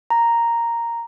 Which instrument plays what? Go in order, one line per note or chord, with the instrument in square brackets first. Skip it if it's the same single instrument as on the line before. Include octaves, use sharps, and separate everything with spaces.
[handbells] A#5